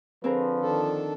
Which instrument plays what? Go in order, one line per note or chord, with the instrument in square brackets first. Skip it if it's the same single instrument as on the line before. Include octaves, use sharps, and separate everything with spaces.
[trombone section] D3 F3 [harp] C4 G#4 A#4 [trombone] B4
[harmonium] D#3 D4 A4